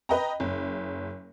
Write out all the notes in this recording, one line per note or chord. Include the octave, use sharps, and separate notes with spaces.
B4 D#5 G5 A#5
F#1